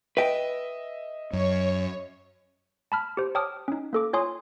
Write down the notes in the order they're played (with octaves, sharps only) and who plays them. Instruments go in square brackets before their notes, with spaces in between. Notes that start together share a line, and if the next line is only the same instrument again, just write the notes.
[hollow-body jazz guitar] B4 G5 [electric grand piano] D#5 E5
[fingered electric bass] F#2 [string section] C#5
[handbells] A5 B5 F6
G4 C5
C#5 G5 A5 D6 D#6 F6
C#4 D#4
A#3 A4 D6
F4 C#5 G#5 C6 D#6